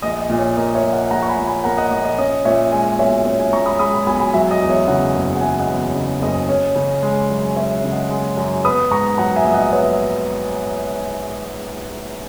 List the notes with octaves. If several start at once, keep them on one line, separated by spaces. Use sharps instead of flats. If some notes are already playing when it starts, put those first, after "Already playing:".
A#1 D#5
D#5
A#2
C#5
A#3 D#5
C#5 E5
A#1
D#5 F#5
A#1 F#5 A#5
C#6
G#5 B5
A#2
G#5 B5
A#3 F#5 A#5
D#5 F#5
A#1 D#5
D#5
C#4 D#5
A#2 C#5 E5
G#3 E5 G#5
B1 C#5 E5
C#4
E5 G#5
A#2 A#5 C#6
B5 D#6
G#3 B5 D#6
G#5 B5
B1 G#5 B5
G#5 B5
F#3 E5 G#5
D#5
E2
C#5 E5
C#3 D#5 F#5
F#1
F#5
F#3 E5 G#5
D#5 F#5
E2
D#5
C#3 D#5
F#1 D#5
C#4
C#3
G#3
F#2
C#4 C#5 E5
C#3
D#5 F#5
G#3
F#2
B3 B5 D#6
G#2 A#5 C#6
F#3 F#5 A#5
E5 G#5
A#1
D#5 F#5
B3 C#5 E5